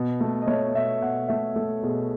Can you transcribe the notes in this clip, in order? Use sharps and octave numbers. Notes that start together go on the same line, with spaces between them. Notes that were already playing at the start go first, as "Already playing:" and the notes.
Already playing: B2
A3
D#5
A3 C#5
B2 E5
B2 F#5
A3 E5
A3 A4
B2 G#4